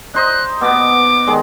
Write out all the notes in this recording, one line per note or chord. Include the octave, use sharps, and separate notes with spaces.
D#4 C5 D#5 F#6
B2 B3 D6
D#3 G#3